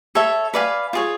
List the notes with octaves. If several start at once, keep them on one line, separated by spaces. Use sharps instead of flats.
A4 C#5 E5
B4 D5 F5 G#5
F4 G#4 C#5